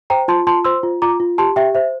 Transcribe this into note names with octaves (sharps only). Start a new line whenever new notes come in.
C5 G5 A#5
F4 A5 C6
F4 A5 C6
C5 C6 E6
F4
F4 A#5 D6
F4
G4 A5 C6
G4 E5 G5
C5 E5